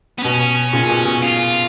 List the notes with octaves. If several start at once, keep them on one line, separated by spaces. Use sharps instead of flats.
B3
B2 C#4
A#2 C#3
B2
B2
F4